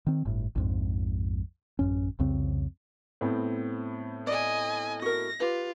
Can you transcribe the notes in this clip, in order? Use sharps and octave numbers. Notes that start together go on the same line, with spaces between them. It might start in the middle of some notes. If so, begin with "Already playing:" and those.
D#3 C4
G1 A2
A#1 F2 G#2
A1 F#2 C#4
C2 F2 C#3 C4
A2 B3 C4
D5 D#5 G#5
F#4 A#4 A#6
F4 G4 B4